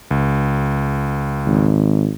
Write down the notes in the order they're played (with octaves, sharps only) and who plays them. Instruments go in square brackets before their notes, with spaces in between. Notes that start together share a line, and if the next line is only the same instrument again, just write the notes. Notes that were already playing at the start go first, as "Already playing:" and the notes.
[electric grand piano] C#2
[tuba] G#1